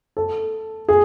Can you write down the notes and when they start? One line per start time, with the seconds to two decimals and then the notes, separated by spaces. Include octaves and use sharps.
0.17 A4
0.89 G#4